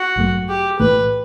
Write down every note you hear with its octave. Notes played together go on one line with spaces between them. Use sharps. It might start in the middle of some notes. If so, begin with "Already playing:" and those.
Already playing: F#4
A1 G2 F#3 A3
G4
B1 A2 E3 A3 B4